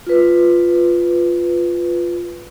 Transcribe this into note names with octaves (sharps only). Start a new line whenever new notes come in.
F4 B4